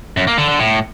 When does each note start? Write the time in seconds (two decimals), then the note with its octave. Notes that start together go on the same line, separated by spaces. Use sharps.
0.17 F#2
0.27 A#3
0.38 D3
0.48 D3
0.59 A2